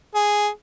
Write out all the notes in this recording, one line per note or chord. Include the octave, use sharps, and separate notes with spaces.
G#4